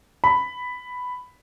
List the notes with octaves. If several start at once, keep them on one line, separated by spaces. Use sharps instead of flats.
B5